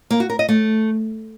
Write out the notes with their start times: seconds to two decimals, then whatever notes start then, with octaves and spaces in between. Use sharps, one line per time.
0.10 A#3
0.20 F#4
0.30 A#4
0.39 D#5
0.49 A3